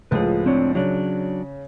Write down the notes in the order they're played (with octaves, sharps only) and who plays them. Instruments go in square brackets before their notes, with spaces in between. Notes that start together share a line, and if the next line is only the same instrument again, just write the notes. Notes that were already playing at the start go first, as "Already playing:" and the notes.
[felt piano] C#2 A2 F3 [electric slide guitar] G#4 B4
[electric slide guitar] C4 D4 C#5
[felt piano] C#3 [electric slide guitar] F#3 D4